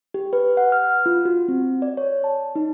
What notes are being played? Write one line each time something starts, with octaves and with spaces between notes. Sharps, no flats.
G4
B4
F#5
F6
F4
F#4
C4
D5
C#5
A5
D#4